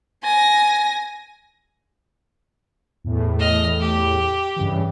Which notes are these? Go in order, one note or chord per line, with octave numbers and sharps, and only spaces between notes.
G#5 A#6
E2 A2
D#5 F6
G4
G2 C#3 E3